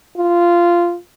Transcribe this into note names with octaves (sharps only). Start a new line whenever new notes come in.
F4